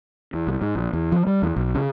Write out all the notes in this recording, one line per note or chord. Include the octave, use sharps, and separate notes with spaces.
E2
C2
G#2
A#1
E2
F3
G3
E2
B1
C#3